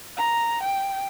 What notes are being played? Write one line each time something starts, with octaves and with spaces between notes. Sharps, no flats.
A#5
G5